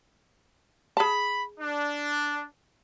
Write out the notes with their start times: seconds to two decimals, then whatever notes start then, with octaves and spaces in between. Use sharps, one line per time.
0.97 G#4 A5 B5
1.59 D4